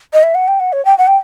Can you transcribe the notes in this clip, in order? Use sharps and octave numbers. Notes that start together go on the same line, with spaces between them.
D#5
E5
F#5
G5
F#5
C#5
G5
F#5
G5